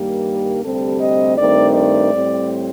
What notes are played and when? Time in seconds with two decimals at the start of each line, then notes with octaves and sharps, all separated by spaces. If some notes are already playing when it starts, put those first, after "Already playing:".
Already playing: G2 D#3 G3 A#3 G4
0.64 D2 C3 G3 C4 A4
1.01 D#5
1.37 G2 D#3 A3 C4 D5
1.75 D5
2.12 A2 G3 C4